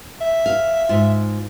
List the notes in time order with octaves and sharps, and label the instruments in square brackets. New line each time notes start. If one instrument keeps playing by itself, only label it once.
[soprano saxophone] E5
[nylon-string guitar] F5
G#2 F4